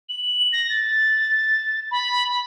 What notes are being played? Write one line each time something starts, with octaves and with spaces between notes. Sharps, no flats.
F#7
A#6
A6
B5